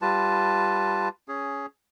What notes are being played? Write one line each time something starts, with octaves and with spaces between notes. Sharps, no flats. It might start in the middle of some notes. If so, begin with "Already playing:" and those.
G3 F4 B4 A5
C#4 G#4